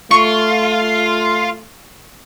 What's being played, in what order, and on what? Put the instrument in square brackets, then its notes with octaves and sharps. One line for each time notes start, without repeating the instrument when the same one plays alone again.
[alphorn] A3 [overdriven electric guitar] F4 [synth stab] C#6